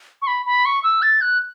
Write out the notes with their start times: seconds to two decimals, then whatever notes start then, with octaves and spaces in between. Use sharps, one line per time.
0.22 C#6
0.27 B5
0.46 B5
0.65 C#6
0.83 E6
1.02 A6
1.21 F#6